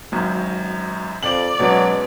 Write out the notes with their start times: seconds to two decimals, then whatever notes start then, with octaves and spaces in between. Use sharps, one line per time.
0.12 G#1 F#2
1.23 F2 D5 F#7
1.59 B2 F#3 G#3 C#4